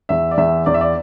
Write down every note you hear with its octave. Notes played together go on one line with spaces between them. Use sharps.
E2 E5
D5
E2 E5
E2 D5
E5
D5